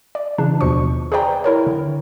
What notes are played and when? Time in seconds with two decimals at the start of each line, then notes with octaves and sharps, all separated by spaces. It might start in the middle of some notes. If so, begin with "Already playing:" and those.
0.15 D5
0.38 C#3 E3 D4
0.61 D#2 B2 F3 C#6
1.12 G#4 B4 C5 D5 G5 A#5
1.44 E4 A#4 C#5
1.67 D3